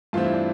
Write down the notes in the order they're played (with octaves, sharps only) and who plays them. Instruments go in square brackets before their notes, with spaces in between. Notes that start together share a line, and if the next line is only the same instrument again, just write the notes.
[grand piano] G2 E3 A3 C4 F4
E4
D4